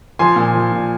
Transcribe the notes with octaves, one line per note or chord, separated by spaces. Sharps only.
F3 G#5 C6
A#2
F3
A#2